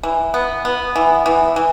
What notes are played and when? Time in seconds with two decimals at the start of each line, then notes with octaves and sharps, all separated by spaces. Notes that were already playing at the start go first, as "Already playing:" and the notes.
0.03 E3
0.34 B3
0.65 B3
0.96 E3
1.26 E3
1.56 E3